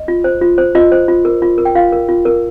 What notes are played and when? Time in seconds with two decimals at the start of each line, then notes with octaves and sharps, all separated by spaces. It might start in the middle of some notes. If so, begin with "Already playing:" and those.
Already playing: D#5
0.08 F4
0.24 C5
0.41 F4
0.58 C5
0.75 F4 D#5
0.92 C5
1.08 F4
1.25 A#4
1.42 F4
1.58 A#4
1.65 G5
1.75 F4 F5
1.92 A#4
2.09 F4
2.25 A#4